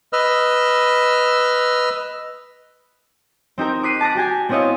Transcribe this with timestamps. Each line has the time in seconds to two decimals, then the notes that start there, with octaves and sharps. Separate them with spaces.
0.13 B4 D#5 E6 F6
3.58 C4 D#4 G4 A#4
3.83 D6 F#6 B6 C7 D#7
4.01 A5 D6 F#6 A#6
4.15 F#4 G4 G#5
4.49 B3 C4 E4 C#5 D#5 F5